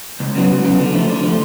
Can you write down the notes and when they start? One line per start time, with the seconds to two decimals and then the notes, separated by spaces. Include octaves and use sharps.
0.20 C#2
0.35 C#3 F#3 B3
0.51 C#2
0.65 C#3 F#3 B3
0.79 D3
0.94 F3 A3
1.10 D3
1.23 F3 A3